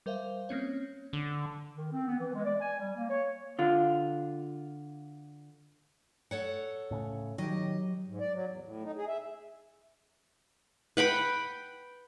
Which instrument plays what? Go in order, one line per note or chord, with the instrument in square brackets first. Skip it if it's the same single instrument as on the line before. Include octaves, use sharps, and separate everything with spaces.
[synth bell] G3 A#4 C5 E5 F5
A#3 C4 C#4 C#5
[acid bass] D3
[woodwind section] D#3
C4
B3
E3
G#3
D5
G#5
G3
A#3
C#5
[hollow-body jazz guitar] D3 F4
[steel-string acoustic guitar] A4 C#5 F#5
[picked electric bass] A2 C#3
[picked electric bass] D#3 [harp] F#3 G4 [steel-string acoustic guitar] D#5
[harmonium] G#2
D5
F#3
E2
A2
D#4
G#4
E5
[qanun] B4 F#5 G5 B5